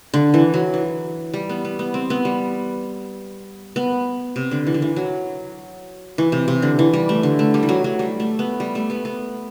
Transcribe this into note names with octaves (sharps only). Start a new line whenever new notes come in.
D3
E3
F#3
E3
G3
B3
B3
B3
C4
B3
G3
B3
C3
D3
E3
D3
E3
F#3
E3
C3
C3
D3
E3
G3
A3
D3
A3
G3
E3
F#3
F#3
G3
A3
B3
G3
A3
B3
B3